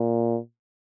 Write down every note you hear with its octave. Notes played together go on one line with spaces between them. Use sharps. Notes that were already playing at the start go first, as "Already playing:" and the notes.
Already playing: A#2